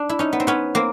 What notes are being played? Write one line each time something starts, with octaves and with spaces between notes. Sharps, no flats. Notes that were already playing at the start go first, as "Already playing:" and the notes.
Already playing: D4
E4
C#4 D#4
B3
C4
B3 C#4
A#3 C4